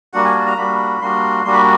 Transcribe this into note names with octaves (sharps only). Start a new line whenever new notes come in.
G3 A#3 D4 F#4 F#5
G#5
A5
A#5
G3 A#3 D4 F#4 B5
G3 A#3 D4 F#4 C6
G3 A#3 D4 F#4 C6
B5